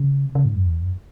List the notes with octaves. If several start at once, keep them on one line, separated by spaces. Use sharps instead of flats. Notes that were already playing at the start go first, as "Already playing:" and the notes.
Already playing: C#3
C3
C#3
G#2
F#2
E2
F#2